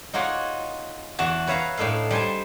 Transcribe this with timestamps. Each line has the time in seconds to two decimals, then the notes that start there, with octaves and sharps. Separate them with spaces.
0.14 D#4 F4 F#4 G#4 C#5 D5
1.19 E2 F#4 A5
1.47 B4 C#5 E5 F5 A#5
1.77 A2 D4 D#4 A4 F5
2.11 G3 C5 G#5 A5